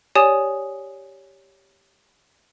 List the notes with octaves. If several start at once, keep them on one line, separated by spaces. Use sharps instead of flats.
G4 C#5 D5 G#5 D#6 E7